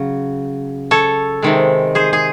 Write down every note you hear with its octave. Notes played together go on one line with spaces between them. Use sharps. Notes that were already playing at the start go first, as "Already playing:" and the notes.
Already playing: C#3 F#3
A4 C#5
C3 D#3 G#3
G#4 C5
G#4